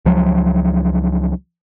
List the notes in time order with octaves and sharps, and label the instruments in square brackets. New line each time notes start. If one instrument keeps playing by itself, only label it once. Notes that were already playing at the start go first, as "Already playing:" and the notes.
[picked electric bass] C#2 F3 F#3